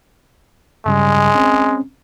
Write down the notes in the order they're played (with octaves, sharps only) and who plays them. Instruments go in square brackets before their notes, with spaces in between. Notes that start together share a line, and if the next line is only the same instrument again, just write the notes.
[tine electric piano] G2 C#3 G3 [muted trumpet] G#3
[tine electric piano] C4 C#4